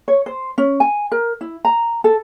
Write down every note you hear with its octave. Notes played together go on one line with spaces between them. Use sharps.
C#5
C5
C#4
G#5
A#4
E4
A#5
A4